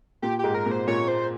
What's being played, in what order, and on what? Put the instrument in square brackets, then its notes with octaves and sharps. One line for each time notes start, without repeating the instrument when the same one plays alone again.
[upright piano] A#2 A#3 [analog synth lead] G4
[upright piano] G#2 G#3 [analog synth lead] G4
[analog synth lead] A#4
[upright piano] A#2 A#3
[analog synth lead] C5
[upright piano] A#2 A#3 [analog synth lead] C#5
[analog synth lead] C5